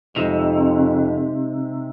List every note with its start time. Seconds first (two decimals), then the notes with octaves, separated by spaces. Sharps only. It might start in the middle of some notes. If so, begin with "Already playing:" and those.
0.16 F2 C3 G#3 D#4